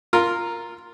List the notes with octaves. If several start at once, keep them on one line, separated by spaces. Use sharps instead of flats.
F4 A#4